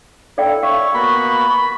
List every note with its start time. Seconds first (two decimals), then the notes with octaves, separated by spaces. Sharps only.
0.38 E4 A4 D5 F5 G5
0.63 C#5 E5 F5 C#6
0.94 A#3 B3 F#4 B5